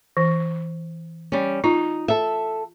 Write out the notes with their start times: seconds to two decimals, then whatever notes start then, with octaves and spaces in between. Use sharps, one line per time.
0.17 E3
1.32 G3 C#4
1.64 D#4 F4
2.08 A4 E5